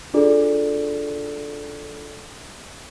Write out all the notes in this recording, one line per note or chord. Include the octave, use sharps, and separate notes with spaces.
D4 F4 G#4 A4 D5